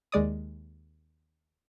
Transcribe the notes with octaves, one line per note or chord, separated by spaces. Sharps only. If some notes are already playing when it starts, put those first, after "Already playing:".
D#2 G#3 D5 D#6